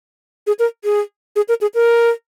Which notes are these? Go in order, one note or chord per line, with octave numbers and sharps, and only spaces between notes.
G#4
A#4
G#4
G#4
A#4
G#4
A#4